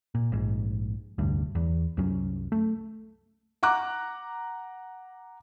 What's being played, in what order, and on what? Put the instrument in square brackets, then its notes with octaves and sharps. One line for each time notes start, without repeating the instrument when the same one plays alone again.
[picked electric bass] A#2
A#1 G#2
F1 D2 G2
E2
C2 F#2 F#3 C#4
A3
[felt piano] F#5 A#5 D6 F#6